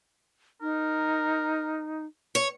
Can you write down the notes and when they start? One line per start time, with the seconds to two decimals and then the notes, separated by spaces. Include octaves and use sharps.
0.62 D#4 A#4
2.35 C#5